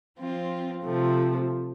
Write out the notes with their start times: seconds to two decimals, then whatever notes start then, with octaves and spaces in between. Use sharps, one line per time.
0.19 F3 C4 F4
0.84 C3 F3 A3